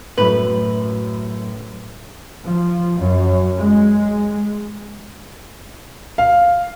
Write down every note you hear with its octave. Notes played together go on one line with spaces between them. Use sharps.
F#2 A2 B4
F3
F#2
G#3
F5